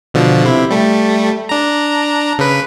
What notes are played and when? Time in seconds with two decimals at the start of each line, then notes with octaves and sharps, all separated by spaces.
0.14 B2 D3 F3
0.45 C3 E4
0.71 G3 A3
1.49 D4 A#5
2.38 C#3 B4